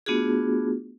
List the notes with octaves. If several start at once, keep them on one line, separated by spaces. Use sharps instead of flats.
A3 B3 D4 F4 F#4 G#4